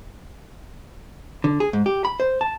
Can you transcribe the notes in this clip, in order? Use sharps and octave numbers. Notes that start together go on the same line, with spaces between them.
D3
G#4
G#2
G4
B5
C5
A5